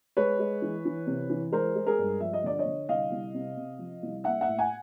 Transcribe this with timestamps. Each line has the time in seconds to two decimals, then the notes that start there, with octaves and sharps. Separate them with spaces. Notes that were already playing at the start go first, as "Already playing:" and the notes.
0.17 G#3 B4 C#5
0.39 G#3
0.62 E3
0.85 E3
1.07 C3
1.30 E3
1.52 G#3 A#4 C5
1.76 G#3
1.86 G#4 A#4
1.99 G2
2.20 F3 E5
2.33 D#5
2.44 D3 D5
2.59 C#5 D#5
2.65 D3
2.88 C2 D#5 F5
3.11 C2
3.34 C3
3.57 C3
3.79 F3
4.03 C2
4.24 A#3 E5 F#5
4.41 E5 F#5
4.48 A2
4.59 F#5 G#5